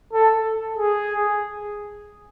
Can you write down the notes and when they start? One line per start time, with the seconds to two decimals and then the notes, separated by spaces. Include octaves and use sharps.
0.13 A4
0.77 G#4